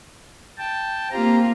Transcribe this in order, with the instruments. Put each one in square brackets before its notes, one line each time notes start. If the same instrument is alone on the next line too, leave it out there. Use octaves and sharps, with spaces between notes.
[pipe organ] G5 A5
[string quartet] A#3 F4 [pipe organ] C4 G4 A#5